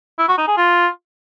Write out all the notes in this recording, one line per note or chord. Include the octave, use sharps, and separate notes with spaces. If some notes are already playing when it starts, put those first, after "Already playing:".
E4
F#4
D#4
G#4
F4